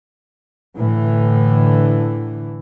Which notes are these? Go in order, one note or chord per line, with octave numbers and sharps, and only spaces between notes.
A2 D3 E3